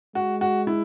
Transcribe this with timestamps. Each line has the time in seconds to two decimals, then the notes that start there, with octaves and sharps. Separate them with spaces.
0.15 G#3 F#4
0.41 F#4
0.67 E4